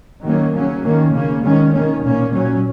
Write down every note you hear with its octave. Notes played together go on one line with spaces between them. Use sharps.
D#3 F#3 A#3 C#4
C#3 F#3 C#4
D#3 A#3 C#4
C#3 A#3 C#4
D#3 G#3 C#4
D#3 A#3 C#4
A#2 A#3 C#4
A#2 F#3 C#4